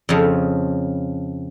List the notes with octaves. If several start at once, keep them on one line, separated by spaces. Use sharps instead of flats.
F2 C#3 F3